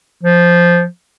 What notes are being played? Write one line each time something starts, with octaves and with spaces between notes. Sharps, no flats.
F3